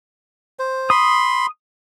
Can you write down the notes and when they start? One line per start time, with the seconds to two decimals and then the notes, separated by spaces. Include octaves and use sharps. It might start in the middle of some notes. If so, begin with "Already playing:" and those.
0.59 C5
0.90 B5 C6 D#6